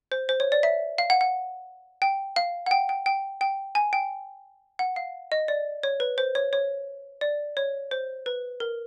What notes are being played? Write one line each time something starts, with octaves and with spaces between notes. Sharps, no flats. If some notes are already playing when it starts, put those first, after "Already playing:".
C5
C5
C#5
D5
E5
F5
F#5
F#5
G5
F5
F#5
G5
G5
G5
G5
G#5
G5
F#5
F5
D#5
D5
C#5
B4
C5
C#5
C#5
D5
C#5
C5
B4
A#4